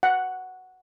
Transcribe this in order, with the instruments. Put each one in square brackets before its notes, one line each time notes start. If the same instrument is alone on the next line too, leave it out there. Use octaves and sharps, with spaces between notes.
[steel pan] F#5